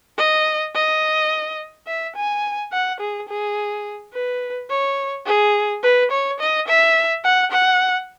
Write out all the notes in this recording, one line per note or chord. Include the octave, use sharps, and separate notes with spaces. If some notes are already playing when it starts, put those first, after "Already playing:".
D#5
D#5
E5
G#5
F#5
G#4
G#4
B4
C#5
G#4
B4
C#5
D#5
E5
F#5
F#5